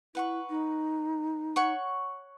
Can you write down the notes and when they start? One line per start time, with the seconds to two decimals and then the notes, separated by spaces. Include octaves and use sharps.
0.15 E4 B4 F#5 C#6
0.50 D#4
1.56 C#5 F#5 C#6